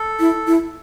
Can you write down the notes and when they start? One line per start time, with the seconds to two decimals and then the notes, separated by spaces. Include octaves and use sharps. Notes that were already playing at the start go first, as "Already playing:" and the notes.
Already playing: A4
0.20 E4
0.47 E4